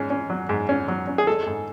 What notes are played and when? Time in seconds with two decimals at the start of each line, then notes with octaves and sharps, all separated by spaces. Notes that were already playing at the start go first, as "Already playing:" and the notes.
Already playing: G#2 C#4
0.10 C#4
0.30 F#3
0.49 G#2
0.69 C#4
0.88 F#3
1.07 C#4
1.18 G#4
1.27 G#3 A4
1.46 G#2